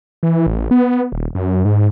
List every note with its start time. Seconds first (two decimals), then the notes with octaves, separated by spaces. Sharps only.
0.23 E3
0.47 A1
0.71 B3
1.12 D#1
1.35 F#2
1.65 G#2